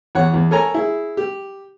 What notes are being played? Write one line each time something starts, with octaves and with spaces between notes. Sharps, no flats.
E2 C#5 F#5
E2
A4 A#4 C#5 G#5 A#5
E4 G#4
G4